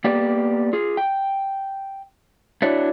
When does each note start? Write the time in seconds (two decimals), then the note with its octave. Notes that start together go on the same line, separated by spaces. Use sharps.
0.04 A#3 B3 G4 D5
0.73 F4 G#4
0.97 G5
2.62 D4 E4 F#4 C#5 D5 E5